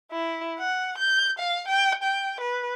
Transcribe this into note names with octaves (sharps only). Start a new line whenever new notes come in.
E4
F#5
G6
F5
G5
G5
B4